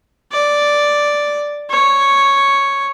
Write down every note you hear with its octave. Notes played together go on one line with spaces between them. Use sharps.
D5
C#5